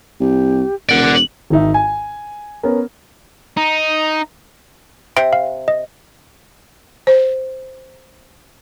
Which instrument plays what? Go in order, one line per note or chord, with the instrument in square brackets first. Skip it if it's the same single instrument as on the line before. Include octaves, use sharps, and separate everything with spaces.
[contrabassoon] C2 [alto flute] G4
[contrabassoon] E1 [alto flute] A#4 [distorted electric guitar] D5 F#5
[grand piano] G#1 D#3 D#4 E5
G#5
B3 C#4 A#4
[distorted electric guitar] D#4
[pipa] C3 [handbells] D7
[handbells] F5
D#5
[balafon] C5